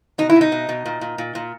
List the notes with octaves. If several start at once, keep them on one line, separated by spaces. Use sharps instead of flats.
B2 D#4
E4
B2
D#4
B2
B2
A#2
A#2
A#2
A#2